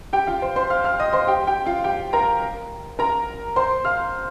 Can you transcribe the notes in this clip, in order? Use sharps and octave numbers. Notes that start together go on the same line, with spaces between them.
G4 G5
F4 F5
C5
C5 C6
F5 F6
F5 F6
D#5 D#6
C5 C6
G4 G5
G4 G5
F4 F5
G4 G5
A#4 A#5
A#4 A#5
C5 C6
F5 F6